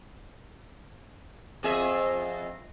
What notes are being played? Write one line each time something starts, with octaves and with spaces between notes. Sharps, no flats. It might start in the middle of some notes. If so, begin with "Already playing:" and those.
F2 G#4 E5